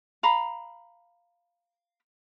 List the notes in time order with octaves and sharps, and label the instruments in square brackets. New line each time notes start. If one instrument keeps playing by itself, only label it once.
[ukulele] F5 A#5 B5